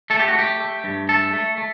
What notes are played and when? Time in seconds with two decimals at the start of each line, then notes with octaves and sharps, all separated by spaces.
0.10 A3 A4
0.19 G4
0.28 F#4
0.34 A3 G4
0.60 A3
0.84 G2
1.09 A3 A4
1.33 A3
1.58 A3